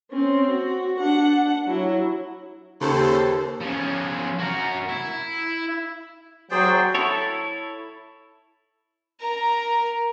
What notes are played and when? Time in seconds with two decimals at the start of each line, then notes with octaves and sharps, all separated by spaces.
0.11 C4 C#4
0.50 F#4
0.98 D4 F#5
1.67 F#3 E4
2.81 D#2 C#3 A4 C5
3.61 F3 C#4
4.39 F#4 A#4
4.89 E4
6.51 F#3 F#4 G#4 C5 D5 G5
6.95 E4 A4 C#5
9.20 A#4 A#5